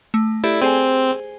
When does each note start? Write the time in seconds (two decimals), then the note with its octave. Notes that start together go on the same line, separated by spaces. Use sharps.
0.14 A3
0.44 E4 G4 A4 D5
0.62 C4 G#4 C5 G#5